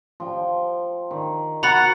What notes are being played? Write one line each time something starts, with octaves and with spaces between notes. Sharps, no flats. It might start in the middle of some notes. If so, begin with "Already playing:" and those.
F3 G5
D#3
F#4 F#5 A#5 B5 A6